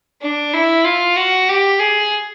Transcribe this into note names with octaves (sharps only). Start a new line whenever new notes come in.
D4
E4
F4
F#4
G4
G#4